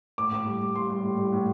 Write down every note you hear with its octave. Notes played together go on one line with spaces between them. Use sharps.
A2 D6
A2
G3
G3
G3 C6
G3
A2
G3
A2